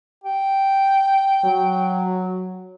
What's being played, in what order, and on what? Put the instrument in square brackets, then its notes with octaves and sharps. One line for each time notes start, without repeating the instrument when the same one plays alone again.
[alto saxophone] G5
[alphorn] F#3